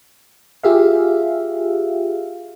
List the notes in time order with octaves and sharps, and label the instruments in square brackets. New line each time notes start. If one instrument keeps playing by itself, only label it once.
[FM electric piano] F4 G4 G#4 E5 F5